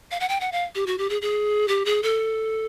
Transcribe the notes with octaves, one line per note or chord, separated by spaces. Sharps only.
F5
F#5
G5
F#5
F5
G4
F#4
G4
G#4
G#4
G4
G#4
A4